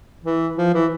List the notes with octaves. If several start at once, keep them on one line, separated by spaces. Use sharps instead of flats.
E3
F3
E3